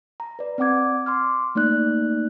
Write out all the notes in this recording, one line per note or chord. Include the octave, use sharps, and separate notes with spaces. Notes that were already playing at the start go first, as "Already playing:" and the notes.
A#5
B4 D5
C4 D5 F#5 D6 G#6
C6 D6 F6
A3 A#3 D#4 D5 F#6